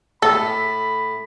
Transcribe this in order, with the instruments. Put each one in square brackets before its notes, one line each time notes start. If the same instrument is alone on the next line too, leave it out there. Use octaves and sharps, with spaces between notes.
[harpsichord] A2 [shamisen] A4 [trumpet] B5